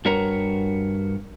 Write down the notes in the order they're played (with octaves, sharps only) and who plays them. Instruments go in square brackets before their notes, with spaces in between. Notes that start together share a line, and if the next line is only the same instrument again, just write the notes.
[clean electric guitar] G2 F#4 A#4 B4 C#5 A#5